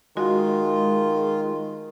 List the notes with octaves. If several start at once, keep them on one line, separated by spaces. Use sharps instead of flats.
D#3 G#3 F4 F#4 D#5 F#5